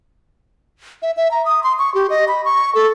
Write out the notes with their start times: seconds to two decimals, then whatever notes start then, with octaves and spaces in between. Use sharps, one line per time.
1.02 E5
1.17 E5
1.31 A#5
1.46 D#6
1.64 C6
1.79 C#6
1.94 G4
2.10 D#5
2.28 B5
2.45 C#6
2.75 A4